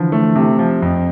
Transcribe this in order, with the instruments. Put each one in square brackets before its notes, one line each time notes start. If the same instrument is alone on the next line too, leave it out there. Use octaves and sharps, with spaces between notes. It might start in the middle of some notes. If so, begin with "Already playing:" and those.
Already playing: [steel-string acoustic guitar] D3 E3 [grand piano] F3
[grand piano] A3
C3
F3
F2